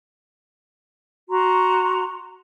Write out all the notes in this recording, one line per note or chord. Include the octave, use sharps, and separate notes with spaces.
F#4 A#5 C6